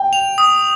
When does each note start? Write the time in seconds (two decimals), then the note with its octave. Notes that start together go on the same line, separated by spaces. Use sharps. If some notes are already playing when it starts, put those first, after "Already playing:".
Already playing: G5
0.13 F7
0.38 D#6